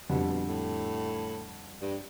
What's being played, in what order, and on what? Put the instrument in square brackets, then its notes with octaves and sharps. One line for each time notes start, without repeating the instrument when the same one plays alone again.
[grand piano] F2 D3 G3 [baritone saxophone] B2
[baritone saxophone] B2
A2
G2